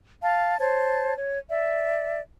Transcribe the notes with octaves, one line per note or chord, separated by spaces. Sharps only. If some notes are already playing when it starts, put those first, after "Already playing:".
F5 A5
C5 C#5 A5
C#5
D5 E5